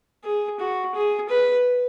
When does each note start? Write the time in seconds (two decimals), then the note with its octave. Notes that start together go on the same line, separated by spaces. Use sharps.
0.24 G#4
0.60 F#4
0.95 G#4
1.29 B4